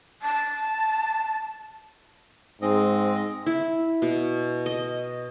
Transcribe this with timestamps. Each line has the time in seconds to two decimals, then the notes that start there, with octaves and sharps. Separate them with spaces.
0.22 A5
2.62 G#2 G#3 C4 D#5
3.46 E4
4.02 B2
4.66 D#5